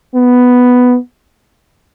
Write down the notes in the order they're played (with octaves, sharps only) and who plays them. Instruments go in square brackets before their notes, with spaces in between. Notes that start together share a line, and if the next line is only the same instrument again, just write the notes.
[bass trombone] B3